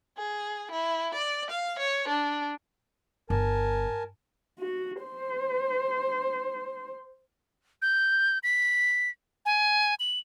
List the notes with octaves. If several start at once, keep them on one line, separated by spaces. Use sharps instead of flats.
G#4
E4
D5
F5
C#5
D4
G1 A#4 G#5 A5
F#4
C5
G6
B6
G#5
F#7